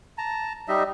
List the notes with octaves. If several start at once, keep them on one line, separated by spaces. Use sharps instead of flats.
A5 A#5
G3 D#4 D#5 E5